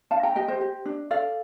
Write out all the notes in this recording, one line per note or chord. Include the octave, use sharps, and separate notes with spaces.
D4 F5 A5
G5 A#5
G4 D#5 G5
C5 D#5
G4
D4
A4 D5 F5